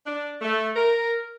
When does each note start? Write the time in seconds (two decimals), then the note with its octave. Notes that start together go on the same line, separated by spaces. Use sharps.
0.06 D4
0.42 A3
0.76 A#4